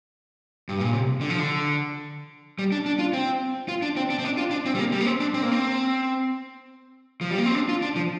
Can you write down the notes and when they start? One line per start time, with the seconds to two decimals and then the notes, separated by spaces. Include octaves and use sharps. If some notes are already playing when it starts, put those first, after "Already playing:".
0.69 G2
0.80 A#2
0.93 C3
1.21 D3
1.30 F3
1.40 D3
2.59 G3
2.72 D4
2.86 D4
2.99 F4
3.13 C4
3.68 F4
3.82 D4
3.96 C4
4.10 D4
4.19 C4
4.24 D4
4.37 F4
4.51 D4
4.66 C4
4.75 G3
4.79 A#3
4.92 G3
5.01 A#3
5.06 C4
5.20 D4
5.34 C4
5.43 A#3
5.52 C4
7.21 F3
7.30 G3
7.38 A#3
7.46 C4
7.55 D4
7.69 F4
7.82 D4
7.96 F3